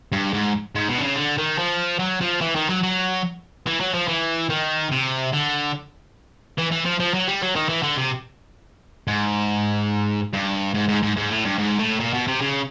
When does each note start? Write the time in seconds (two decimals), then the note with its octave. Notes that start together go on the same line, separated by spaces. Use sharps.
0.12 G2
0.33 G#2
0.75 G#2
0.89 B2
0.98 D3
1.03 C#3
1.16 D3
1.38 D#3
1.59 F3
1.99 F#3
2.21 F3
2.41 E3
2.56 D#3
2.70 F#3
2.83 F#3
3.67 E3
3.80 F#3
3.94 F3
4.08 E3
4.50 D#3
4.91 C3
5.33 D3
6.58 E3
6.72 E3
6.86 F3
7.00 F3
7.14 F#3
7.28 G3
7.42 F#3
7.56 D#3
7.69 E3
7.83 D3
7.97 C3
9.08 G#2
10.33 G2
10.75 G#2
10.88 G#2
11.03 G#2
11.16 G#2
11.30 A2
11.45 G2
11.58 G#2
11.79 A2
12.00 A#2
12.14 B2
12.27 C3
12.42 C#3